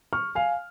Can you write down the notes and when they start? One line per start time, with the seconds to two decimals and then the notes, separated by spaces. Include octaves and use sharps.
0.13 C#6 F6
0.35 F5 G#5